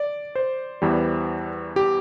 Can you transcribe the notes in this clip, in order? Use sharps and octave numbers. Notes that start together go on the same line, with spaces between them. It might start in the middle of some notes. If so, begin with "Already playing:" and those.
Already playing: D5
C5
E2 E3 G3
G4